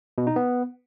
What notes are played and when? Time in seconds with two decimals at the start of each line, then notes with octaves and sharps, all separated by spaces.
0.18 B2
0.27 D#4
0.36 B3